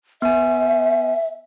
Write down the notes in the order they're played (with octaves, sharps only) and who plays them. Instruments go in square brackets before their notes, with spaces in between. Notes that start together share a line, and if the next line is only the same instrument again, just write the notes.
[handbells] B3 G#5 [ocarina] E5